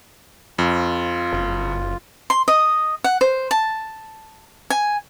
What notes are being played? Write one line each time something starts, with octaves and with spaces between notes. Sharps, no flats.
F2 F4
F#1
C6
D#5
F#5
C5
A5
G#5